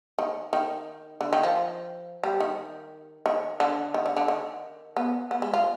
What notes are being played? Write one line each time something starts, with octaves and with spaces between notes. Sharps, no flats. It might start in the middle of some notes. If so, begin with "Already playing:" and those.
D#3
D#3
D3
D#3
F3
G3
D#3
D#3
D3
D#3
D3
D3
D#3
B3
B3
G#3
F4